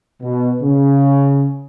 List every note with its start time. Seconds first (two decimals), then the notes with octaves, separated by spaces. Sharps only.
0.22 B2
0.62 C#3